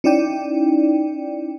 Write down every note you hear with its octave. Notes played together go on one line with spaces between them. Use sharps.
C#4 D#4 E4 D5 G5